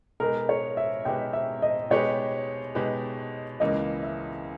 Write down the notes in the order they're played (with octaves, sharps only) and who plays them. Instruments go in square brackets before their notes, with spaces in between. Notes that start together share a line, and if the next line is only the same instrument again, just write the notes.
[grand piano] B2 G#3 D#4 G4 B4 [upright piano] A#4
[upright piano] C#5
E5
[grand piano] B2 G#3 D#4 G4 B4 [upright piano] G5
[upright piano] E5
D#5
[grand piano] B2 G#3 D#4 G4 B4 [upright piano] C#5
[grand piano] B2 G#3 D#4 G4 B4
[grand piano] C#2 C#3 E3 A#3 [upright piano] D#5
[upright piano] E5